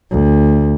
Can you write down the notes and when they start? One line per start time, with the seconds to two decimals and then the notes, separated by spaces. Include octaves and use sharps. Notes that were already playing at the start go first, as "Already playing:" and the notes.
0.11 D2